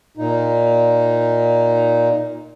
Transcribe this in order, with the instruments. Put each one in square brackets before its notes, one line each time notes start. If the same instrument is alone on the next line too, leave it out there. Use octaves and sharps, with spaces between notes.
[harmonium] A#2 D#4